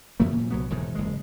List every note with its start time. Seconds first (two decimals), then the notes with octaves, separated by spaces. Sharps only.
0.20 F#2 F3 A3 A#3
0.33 A#2
0.51 C2 F#3 B3
0.70 E1 E2 G#2 D#3
0.95 F#1 G#3